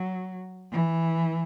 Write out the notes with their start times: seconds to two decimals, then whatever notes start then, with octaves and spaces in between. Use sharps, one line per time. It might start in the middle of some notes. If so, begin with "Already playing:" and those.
Already playing: F#3
0.72 E3